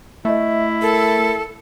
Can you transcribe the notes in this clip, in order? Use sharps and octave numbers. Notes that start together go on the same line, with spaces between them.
A3 E4 D#5 E5
A4 A#4